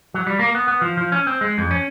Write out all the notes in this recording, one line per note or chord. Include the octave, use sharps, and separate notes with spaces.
F#3
G3
A#3
B3
B3
F3
F3
C#4
C4
G#3
F2
C#4